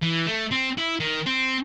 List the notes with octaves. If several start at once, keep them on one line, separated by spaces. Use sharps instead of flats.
E3
A3
C4
E4
D#3
C4